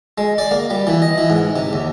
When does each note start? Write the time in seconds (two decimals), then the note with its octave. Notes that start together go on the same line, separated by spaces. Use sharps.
0.18 G#3
0.38 D5
0.51 A#3
0.70 G3
0.87 E3
1.02 D#5
1.18 E3
1.30 G#2
1.56 C3
1.73 D#2